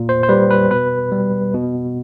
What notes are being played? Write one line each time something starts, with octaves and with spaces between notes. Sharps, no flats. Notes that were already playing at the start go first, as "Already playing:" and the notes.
Already playing: A#2
C5
C5
G3 B4
B4
B2 B4
G3
B2